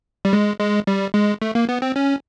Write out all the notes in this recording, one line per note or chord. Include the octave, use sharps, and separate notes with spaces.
G3
G#3
G#3
G3
G#3
A3
A#3
B3
C4
C#4